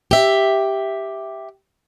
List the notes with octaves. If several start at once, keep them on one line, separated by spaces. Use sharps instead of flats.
G4 E5